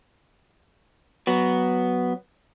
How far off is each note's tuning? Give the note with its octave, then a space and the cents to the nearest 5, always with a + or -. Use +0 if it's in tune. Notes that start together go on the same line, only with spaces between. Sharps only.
F#3 +5 B3 +0